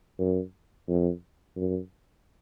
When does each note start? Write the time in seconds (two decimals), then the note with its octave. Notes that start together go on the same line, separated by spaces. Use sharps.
0.19 F#2
0.88 F2
1.56 F#2